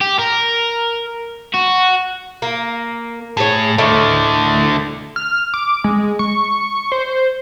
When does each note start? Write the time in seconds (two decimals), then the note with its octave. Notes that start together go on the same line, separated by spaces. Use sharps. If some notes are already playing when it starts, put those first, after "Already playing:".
0.01 G4
0.19 A#4
1.54 F#4
2.42 A#3
3.37 A2 G#4 C#5
3.78 A2 D3 D#3 A3
5.16 F6
5.54 D6
5.84 G#3
6.19 C#6
6.92 C5